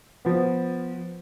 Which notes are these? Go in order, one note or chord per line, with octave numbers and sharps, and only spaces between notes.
F3 B3